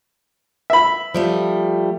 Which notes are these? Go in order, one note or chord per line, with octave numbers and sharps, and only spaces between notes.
E5 B5
F3 G3 A3